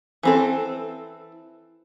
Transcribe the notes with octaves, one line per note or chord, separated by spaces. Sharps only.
E3 C4 A4